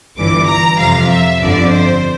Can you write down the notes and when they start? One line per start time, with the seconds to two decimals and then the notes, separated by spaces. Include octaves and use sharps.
0.17 G1 G2 E3 D6
0.48 A#5
0.79 F2 C3 F3 F5
1.10 E5
1.41 G1 F2 D3 F3 D5
1.71 C5